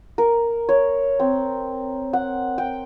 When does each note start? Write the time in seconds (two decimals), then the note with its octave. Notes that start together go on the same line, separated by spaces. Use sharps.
0.18 A#4
0.69 C#5
1.20 C4
2.13 F#5
2.58 G5